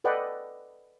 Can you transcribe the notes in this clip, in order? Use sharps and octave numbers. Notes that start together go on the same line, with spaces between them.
A4 B4 D5 D#5 F#5 G5